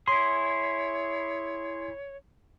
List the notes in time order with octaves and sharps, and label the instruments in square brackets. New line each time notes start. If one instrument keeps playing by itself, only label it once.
[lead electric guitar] E4 G#4 [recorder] C#5 [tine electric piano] C6